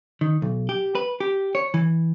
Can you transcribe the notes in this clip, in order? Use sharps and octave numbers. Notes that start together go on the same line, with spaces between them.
D#3
B1
G4
B4
G4
C#5
E3